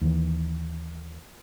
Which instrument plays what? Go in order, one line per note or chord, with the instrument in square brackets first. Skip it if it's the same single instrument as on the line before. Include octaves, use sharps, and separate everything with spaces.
[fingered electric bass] D#2 E3